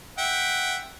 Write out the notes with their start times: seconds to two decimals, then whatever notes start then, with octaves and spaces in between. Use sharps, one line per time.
0.18 E5 F#5 G5